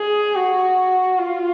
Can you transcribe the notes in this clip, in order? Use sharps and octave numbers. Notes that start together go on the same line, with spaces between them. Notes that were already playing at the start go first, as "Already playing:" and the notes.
Already playing: G#4
F#4
F4